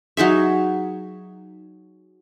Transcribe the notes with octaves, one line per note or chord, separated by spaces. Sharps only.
F#3 D#4 G#4 E5